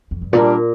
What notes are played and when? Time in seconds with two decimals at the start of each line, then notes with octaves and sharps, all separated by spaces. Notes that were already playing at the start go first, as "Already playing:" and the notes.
0.11 F2
0.21 G2
0.33 A#2 G3 D4 A#4